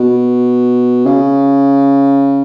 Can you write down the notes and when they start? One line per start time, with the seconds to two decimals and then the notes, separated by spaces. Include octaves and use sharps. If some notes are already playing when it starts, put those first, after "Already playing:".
Already playing: B2
1.06 C#3